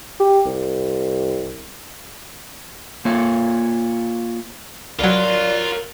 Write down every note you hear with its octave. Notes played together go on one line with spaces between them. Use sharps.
G4
C2
A#3 F4 C#5
C2 F#3 F4 A#4 C#5 D5